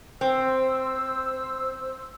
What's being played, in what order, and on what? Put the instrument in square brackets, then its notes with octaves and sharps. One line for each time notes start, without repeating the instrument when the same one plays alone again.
[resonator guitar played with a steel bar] C4 [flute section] C5 E6